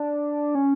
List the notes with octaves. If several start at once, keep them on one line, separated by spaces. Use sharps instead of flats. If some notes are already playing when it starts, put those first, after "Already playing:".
Already playing: D4
C#4